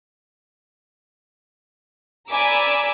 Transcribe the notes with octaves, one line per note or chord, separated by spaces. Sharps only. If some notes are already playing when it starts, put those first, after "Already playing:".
D5 G#5 A#5 B5 D6 E6